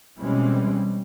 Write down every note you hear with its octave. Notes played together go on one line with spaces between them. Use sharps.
B2 E3 G3 G#3 C4 C#4